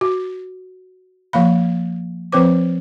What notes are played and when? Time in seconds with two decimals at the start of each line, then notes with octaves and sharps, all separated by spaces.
0.01 F#4
1.33 F3 A#3 F5 B5
2.32 F3 C4 B4 C5 D6